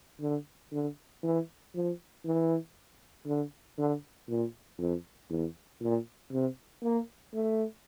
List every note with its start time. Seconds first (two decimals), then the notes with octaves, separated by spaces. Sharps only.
0.21 D3
0.72 D3
1.23 E3
1.75 F3
2.25 E3
3.26 D3
3.78 D3
4.29 A#2
4.79 F2
5.30 E2
5.81 A#2
6.31 C3
6.83 A#3
7.33 A3